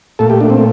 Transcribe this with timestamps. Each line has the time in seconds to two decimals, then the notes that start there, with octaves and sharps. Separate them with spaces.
0.19 A#2 A3 A4
0.30 G4
0.41 D4
0.50 C4